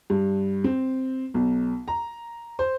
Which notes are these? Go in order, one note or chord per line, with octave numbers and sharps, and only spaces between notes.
G2
C4
B1
A#5
C5